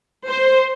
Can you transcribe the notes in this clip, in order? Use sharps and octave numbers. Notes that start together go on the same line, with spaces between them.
C5